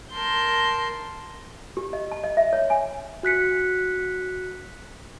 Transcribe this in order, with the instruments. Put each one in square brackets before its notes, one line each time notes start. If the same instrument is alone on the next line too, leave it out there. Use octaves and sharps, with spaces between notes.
[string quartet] A#4 A5 C6 G6
[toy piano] G4
D#5
A5
D#5
E5
C#5
G#5
[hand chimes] F#4 F#6 B6 C#7